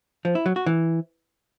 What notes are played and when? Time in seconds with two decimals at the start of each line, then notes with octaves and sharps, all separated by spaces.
0.25 F3
0.35 E4
0.46 F#3
0.56 F#4
0.66 E3